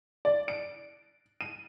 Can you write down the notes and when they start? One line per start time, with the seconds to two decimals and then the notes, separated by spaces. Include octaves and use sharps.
0.25 D5
0.48 D7
1.41 D#7